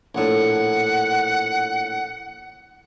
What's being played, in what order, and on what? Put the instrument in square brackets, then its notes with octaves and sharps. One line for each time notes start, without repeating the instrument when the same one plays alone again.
[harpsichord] A#1 A2 [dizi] F#5